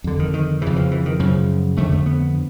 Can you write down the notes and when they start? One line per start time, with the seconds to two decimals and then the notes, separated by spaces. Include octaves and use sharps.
0.04 F2 D3
0.19 D#3
0.33 D#3
0.62 F2 C#3 E3
0.76 F3
0.91 E3
1.06 D#3
1.20 F#2 C#3 F3
1.77 F2 D3 A3
1.92 A3
2.06 B3